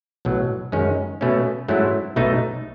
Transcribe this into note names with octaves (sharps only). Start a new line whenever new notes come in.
B1 A2 F#3
F#2 D#3 G#3 C#4
B2 A3 C#4
G#2 F#3 A3 C#4 E4
B1 B2 A3 D#4